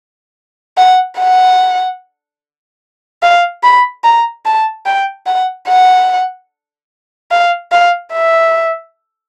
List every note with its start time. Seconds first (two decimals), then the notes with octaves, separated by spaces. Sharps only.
0.77 F#5
1.18 F#5
3.23 F5
3.63 B5
4.04 A#5
4.45 A5
4.86 G5
5.26 F#5
5.68 F#5
7.31 F5
7.72 F5
8.13 E5